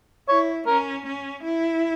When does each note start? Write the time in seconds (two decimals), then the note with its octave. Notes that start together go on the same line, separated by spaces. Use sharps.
0.28 E4 C#5
0.66 C#4 A#4
1.06 C#4
1.44 E4